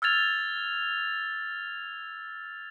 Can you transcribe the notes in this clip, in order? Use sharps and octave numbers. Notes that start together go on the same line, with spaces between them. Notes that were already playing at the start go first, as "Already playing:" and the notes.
E6 F6 G#6 A6 F7